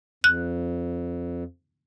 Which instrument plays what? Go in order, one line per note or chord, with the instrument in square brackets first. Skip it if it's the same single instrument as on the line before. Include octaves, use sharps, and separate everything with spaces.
[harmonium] F2 [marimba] F#6